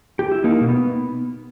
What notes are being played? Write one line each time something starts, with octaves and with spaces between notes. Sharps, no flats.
G4
E4
A#3 D#4
B2
B3